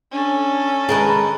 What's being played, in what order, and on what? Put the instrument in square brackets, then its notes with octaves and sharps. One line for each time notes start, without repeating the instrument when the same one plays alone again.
[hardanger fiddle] C#4 A4 [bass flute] D4
[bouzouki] D#3 A#4 B4 [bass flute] G#3 [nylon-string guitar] G#4 D#5 A5